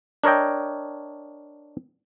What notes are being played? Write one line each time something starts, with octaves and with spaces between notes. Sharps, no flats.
D4 A#4 C#5 D#5 G5